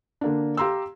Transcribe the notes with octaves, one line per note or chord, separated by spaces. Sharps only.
D3 A#3 D4
G4 F5 A#5 C6 E6